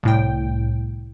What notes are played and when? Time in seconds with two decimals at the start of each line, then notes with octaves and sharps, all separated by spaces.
0.03 C2 A2 G5